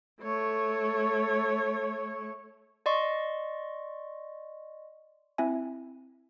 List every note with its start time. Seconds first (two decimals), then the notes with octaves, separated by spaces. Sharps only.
0.22 A3 C#5
2.86 D5 D#5 C6 C#6
5.38 C4 E4 E5 G#5